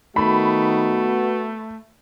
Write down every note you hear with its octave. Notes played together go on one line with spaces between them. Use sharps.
D#3 A3 B3 F#4 B5